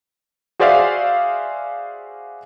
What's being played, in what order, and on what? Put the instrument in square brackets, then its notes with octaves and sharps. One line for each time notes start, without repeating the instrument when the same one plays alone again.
[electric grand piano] F#4 G#4 C5 D5 E5 F5